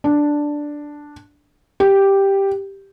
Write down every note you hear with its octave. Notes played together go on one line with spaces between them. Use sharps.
D4
G4